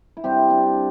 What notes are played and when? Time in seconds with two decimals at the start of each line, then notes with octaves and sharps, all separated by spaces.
0.17 E4
0.24 C3 G3 C4 G4
0.50 D4